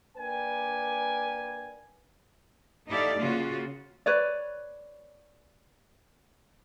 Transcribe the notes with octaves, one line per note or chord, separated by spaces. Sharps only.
A#3 D4 B4 G5 G#5
D#4 E4 G4 A4 D5 F5
C#3 A#3 F4 F#4
B4 C#5 D5